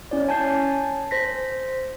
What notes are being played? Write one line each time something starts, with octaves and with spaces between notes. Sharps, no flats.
C#4 E4 C#5 D5
C#5 G#5 A5 G6 C7
C5 A#6 B6